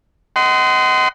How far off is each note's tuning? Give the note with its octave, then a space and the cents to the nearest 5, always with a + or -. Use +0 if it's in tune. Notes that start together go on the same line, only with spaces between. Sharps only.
D#5 +10 F#5 +30 C6 -25